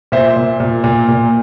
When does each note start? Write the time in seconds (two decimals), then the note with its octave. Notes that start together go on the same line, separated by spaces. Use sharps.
0.12 A#2 C5 E5
0.36 A#2
0.60 A#2
0.84 A#2
1.08 A#2